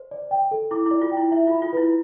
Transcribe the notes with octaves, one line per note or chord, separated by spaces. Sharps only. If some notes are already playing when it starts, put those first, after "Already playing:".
Already playing: C5
D5
G5
A4
E4 D6
E4 D5
F4
G5
E4
E4 E5
F4 B5
F4
E4 B4